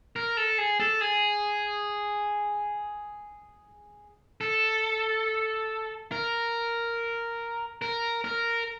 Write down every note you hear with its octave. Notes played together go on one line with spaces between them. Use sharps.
A#4
A4
G#4
A4
G#4
A4
A#4
A#4
A#4